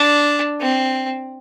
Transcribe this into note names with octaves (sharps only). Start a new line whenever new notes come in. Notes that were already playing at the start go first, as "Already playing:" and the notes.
Already playing: D4
C4